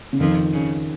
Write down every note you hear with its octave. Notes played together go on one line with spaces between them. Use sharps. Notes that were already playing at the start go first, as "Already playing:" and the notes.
C#3
F2 D#3 F3
C#3